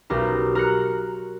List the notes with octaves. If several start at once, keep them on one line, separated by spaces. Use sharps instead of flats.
B1 G4 A#4
A#4 F#6 C#7